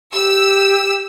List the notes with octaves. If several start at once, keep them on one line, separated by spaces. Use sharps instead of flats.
G4 E6